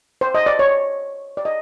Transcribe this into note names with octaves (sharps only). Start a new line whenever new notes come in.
C5
D#5
D5
C#5
D5
D#5